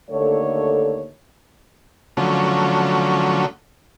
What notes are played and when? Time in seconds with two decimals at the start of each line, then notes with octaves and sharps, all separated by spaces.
0.10 D#2 D3 A3 C#5
2.17 D3 F3 F#3 A3 C#4